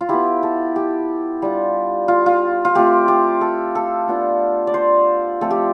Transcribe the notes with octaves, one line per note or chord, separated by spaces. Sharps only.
F4
B3 E4 G4
A4
G4
G3 D4 F4
F4
F4
F4
A3 C4 F4 G4
G4
A4
A4
B3 D4 F4
D5
C5
F3 A3 C4 A4
G4